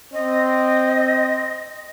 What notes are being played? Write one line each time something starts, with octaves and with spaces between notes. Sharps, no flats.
C4 D#5